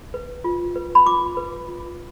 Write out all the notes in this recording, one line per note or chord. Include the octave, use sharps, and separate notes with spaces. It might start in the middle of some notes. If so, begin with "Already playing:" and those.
B4
F4
B4
B5
F4 D6
B4
F4